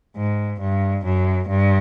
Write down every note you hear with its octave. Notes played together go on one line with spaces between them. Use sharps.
G#2
G2
F#2
G2